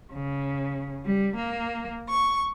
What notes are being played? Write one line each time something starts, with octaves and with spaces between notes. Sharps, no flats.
C#3
G3
A#3
C#6